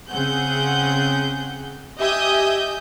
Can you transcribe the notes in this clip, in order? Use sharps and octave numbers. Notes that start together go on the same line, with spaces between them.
C#3 C4 G#4 F#5 G6
G4 D#5 E5 G#5 D#6 G6